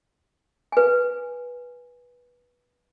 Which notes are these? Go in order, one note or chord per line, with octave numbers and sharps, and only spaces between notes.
B4 G#5